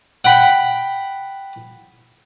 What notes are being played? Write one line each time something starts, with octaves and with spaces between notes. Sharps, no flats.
F#5 G5 B5